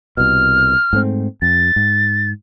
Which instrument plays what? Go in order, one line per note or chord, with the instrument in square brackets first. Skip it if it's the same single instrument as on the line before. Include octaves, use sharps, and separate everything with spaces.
[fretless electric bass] C2 B2 [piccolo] F6
[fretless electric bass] G#2 A3 C4
[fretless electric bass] F2 [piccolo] A6
[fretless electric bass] G#2